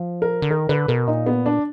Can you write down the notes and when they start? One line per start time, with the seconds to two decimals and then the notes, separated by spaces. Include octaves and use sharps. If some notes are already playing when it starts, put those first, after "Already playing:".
Already playing: F3
0.22 A#4
0.42 D3
0.50 D#3 A#4
0.69 D3 B4
0.88 B2 A#4
1.07 A#2 D#4
1.26 B3
1.46 D4